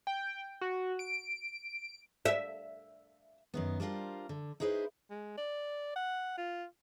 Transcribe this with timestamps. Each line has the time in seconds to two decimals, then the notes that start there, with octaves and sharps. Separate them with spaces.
0.07 G5
0.61 F#4
0.99 D7
2.25 E5
3.54 F#2 D#3 B3
3.80 G3 D4 F4 A#4 C5
4.29 D3
4.60 D#4 E4 G#4 B4 C5
5.10 G#3
5.38 D5
5.96 F#5
6.38 F4